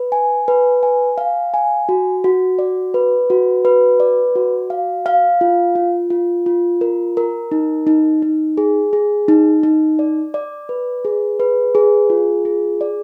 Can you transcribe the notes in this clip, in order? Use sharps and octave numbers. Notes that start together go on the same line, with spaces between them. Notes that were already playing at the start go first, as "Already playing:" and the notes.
Already playing: B4
G#5
B4
G#5
F5
G#5
F#4
F#4
D5
B4
F#4
B4
D5
F#4
F5
F5
F4
F4
F4
F4
A#4
A#4
D#4
D#4
D#4
G#4
G#4
D#4
D#4
D5
D5
B4
G#4
B4
G#4
F4
G#4
D5